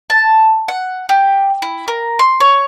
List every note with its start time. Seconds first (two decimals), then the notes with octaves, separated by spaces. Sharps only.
0.10 A5
0.68 F#5
1.09 G4
1.62 E4
1.88 A#4
2.19 C6
2.40 C#5